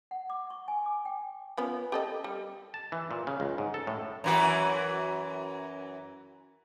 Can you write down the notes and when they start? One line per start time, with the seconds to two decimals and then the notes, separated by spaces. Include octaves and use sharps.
0.11 F#5
0.30 D6
0.50 C#6
0.68 G#5
0.86 D6
1.05 G5
1.58 F3 B3 C#4
1.92 G4 A4 D#5
2.24 G3
2.74 A5
2.92 E3
3.11 A#2
3.27 C#3
3.40 C#2
3.58 G#2
3.74 A4
3.87 A2
4.24 F#2 E3 F#4